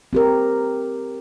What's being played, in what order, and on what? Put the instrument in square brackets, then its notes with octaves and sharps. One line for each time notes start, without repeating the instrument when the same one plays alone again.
[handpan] C4 G4 A#4